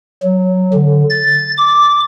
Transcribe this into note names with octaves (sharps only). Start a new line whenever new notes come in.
F#3
D3
A6
D6